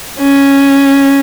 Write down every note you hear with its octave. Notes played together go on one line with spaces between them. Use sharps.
C#4